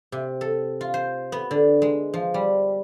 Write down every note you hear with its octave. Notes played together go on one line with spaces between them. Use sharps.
C3
A4
F4
C5
B3
D3
G#3
F3
G3